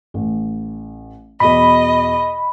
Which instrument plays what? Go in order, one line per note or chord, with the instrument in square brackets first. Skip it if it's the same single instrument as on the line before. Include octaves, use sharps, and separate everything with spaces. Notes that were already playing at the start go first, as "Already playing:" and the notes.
[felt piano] A1
[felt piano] E2 B2 [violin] D#5 [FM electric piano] B5